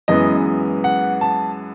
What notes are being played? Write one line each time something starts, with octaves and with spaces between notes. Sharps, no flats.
F#2 E3 G#3 B3 D#5
F#5
A5